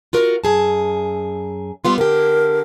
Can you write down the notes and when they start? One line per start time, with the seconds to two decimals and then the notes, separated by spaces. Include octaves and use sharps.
0.13 F4 F#4 A#4
0.44 F#2 G#4 A5
1.85 G3 B3 F4 C6
1.98 D3 G4 A#4